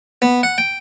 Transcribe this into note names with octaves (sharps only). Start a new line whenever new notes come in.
B3
F#5
G5